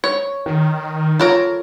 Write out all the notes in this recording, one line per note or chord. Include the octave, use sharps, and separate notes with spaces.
C#5
D#3
F4 A4 A#4 C#5 A#5